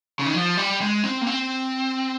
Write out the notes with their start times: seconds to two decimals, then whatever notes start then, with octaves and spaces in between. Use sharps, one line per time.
0.19 C#3
0.26 D#3
0.34 F3
0.57 G3
0.81 G#3
1.04 C4
1.21 A#3
1.27 C4